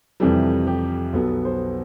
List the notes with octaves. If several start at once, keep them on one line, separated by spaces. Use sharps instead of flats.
F2 C3 E3 G3 A4
G4
B1 B2 B3 A4
C5